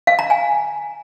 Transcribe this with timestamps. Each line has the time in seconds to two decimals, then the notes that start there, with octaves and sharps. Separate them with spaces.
0.07 F5
0.19 A#5
0.30 G#5